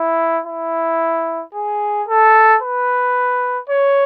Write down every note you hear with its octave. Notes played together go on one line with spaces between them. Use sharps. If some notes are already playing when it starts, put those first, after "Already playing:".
Already playing: E4
E4
G#4
A4
B4
C#5